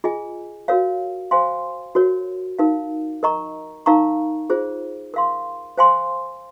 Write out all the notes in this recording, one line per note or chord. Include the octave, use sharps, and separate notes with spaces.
F4 G#4 D#5 G#5
F#4 A#4 C#5 F5
C5 F5 G#5 C6
F#4 A#4 C#5
D#4 A#4 F5
A#4 D#5 A#5 C#6
D#4 A#4 F5 A#5 C#6
F4 G#4 C5
A#4 F5 C6
C5 F5 G#5 C6